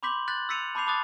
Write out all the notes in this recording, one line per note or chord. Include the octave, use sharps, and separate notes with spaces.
B5 C6 D6 G6 B6 F#7
F#6 G6 A6 B6 F#7
E6 A6 B6 C#7 D#7 F7
A5 B5 D6 G6 C7 F7
A5 B5 D6 D#6 F#6 A6